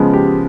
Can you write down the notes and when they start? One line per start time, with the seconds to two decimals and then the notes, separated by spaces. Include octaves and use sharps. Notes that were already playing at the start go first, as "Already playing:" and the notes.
Already playing: C#3 F3 G#3 B3
0.13 G4